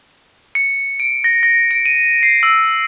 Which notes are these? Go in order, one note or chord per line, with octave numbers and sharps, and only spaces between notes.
C#7
D7
A#6
A#6
D7
D#7
C7
E6